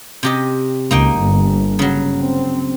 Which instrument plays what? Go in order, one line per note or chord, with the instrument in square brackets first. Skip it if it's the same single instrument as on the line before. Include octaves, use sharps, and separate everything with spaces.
[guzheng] C3 G4 D#5
[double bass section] C#2 [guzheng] A#3 D#4 G5
[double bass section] G1
[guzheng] C#3 F#3
[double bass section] C4